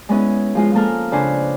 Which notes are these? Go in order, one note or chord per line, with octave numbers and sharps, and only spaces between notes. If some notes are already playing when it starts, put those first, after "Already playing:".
G#3 B3 C#4 E4 G#4
F3 G#3 F4
F3 A#3 A4 A#4 A#5 F6
C#3 C4 D4 B4 C5 G#5